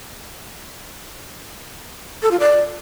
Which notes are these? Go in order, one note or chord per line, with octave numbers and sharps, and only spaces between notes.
A4
F4
D5